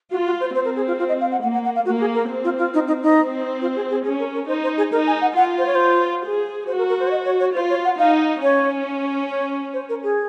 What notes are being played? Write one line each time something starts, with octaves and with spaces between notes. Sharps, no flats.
F4 F#4
F#4
C5
C4 C5
A#4
G#4
F4
F4
D#5
F5
F#5
A#3 F#5
F#5
F#5
F5
A#3 F#4
G#4
A#4
C4
F4
F4
D#4
D#4
D#4
C4
F4
G#4
G#4
C#4 G#4
A#4
A#4
D#4 C5
C5
G#4
D#4 A#4
G#5
F#5
F4 F#5
C5
C#5
C5
G#4
F#4 C5
A#4
A#4
C5
C#5
D#5
C#5
C#5
F4 C5
C#5
F#5
D#4 F5
C#4 C#5
C#5
C5
A#4
G#4